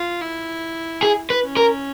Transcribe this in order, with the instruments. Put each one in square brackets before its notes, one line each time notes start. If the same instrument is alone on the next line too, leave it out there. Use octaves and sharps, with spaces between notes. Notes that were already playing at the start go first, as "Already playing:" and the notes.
Already playing: [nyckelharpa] F4
E4
[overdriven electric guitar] G#4
B4
[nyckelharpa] C#4
[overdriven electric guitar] A#4